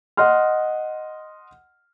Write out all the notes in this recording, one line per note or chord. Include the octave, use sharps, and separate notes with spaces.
D#5 F#5 C6 F6